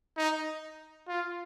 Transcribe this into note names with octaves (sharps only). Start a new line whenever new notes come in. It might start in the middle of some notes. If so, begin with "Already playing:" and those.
D#4
F4